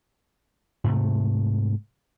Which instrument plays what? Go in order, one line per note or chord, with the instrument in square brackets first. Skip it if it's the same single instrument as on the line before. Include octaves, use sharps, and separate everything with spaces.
[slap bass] G#2 C3 A3